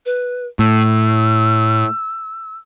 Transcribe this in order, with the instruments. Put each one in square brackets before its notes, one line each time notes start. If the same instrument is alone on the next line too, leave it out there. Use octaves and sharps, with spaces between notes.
[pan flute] B4
[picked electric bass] A2 [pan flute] E6